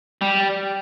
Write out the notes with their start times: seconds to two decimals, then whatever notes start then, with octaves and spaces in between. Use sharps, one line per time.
0.21 G3